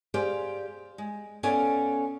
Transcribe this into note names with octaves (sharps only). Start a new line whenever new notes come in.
G4 G#4 C5 D5 F5
G#3
B3 C#4 A4 D5 F5 G#5